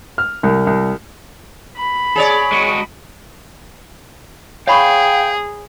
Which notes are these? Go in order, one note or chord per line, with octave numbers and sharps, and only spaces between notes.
F6
C2
C2
B5
G#4 C#5 D5
G#3 F#4
G#4 C#5 F5 G5 B5 C#6